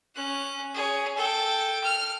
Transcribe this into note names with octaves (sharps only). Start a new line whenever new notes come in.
C#4 F#6
G#4 C#5
A4 G5
F6